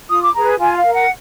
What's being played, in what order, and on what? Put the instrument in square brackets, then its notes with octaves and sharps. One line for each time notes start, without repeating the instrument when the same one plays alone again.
[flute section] F4 D#6
D6
G#4 B4 A#5
F4 G#5
F5
A#4
F#5